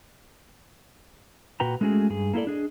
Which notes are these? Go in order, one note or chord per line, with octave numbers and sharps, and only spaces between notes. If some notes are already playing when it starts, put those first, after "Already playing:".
A#2 F#4 B4 G5 A#5
G#3 A3 C#4 F#4 G#4
G2 G#4
A#3 E4 F4 A4 D5
D4 G#4 D#5